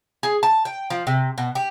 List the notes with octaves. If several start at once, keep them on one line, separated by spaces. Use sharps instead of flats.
G#4
A5
G5
F3
C3
B2
G4